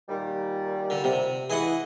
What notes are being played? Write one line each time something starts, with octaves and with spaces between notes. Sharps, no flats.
A#2 D#3 G3
D3
C3
E3 G#4 D#5 F#5